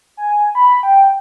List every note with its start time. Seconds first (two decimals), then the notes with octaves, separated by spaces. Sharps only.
0.17 G#5
0.55 B5
0.83 G5